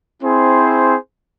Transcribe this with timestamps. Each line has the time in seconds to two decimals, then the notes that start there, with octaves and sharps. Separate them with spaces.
0.22 C4 E4 G#4 C5